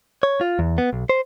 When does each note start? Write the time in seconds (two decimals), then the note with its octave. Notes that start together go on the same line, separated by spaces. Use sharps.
0.23 C#5
0.41 F4
0.59 E2
0.78 B3
0.93 B1
1.09 C5